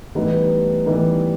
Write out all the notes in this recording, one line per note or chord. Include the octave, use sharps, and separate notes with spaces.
A2 E3 G3 B3 D#4
A2 E3 G3 B3 D#4